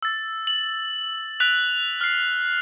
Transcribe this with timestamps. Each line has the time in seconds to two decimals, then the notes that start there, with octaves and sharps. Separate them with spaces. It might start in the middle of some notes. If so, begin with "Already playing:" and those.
0.02 E6 A6
0.47 F#7
1.40 F#6 B6 F7
2.01 F6 C7